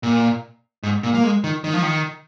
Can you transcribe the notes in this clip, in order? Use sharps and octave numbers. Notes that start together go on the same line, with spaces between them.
A#2
G#2
A#2
A#3
G#3
D#3
D#3
F3
D#3